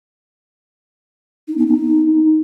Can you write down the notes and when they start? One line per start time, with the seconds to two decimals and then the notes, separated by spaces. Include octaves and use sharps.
1.48 D#4
1.57 B3
1.67 D#4